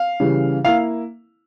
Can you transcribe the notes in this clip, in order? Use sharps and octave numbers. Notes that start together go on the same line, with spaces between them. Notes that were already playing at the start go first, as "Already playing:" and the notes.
Already playing: F5
C#3 E3 G3
A#3 E4 F5